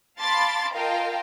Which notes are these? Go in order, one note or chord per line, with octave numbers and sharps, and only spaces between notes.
F5 A5 B5 C6 D6 A6
F4 A#4 D#5 F5 G5 A5